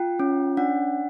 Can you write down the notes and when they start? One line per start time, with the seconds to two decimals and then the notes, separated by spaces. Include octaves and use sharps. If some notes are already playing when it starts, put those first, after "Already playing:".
Already playing: F4 G5
0.20 C#4
0.57 D4 F#5